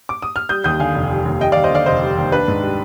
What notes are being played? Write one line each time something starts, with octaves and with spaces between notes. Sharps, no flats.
D6
D#6
F6
G3 D#6 G6
D#2 D#6 G6
D3 F5 G#5
F1
G3
D#2
G3 D#5 G5
D5 F5
D#2
C5 D#5
D3 D5 F5
F1 C5 D#5
G3
D#2
D4 B4
G#2
G3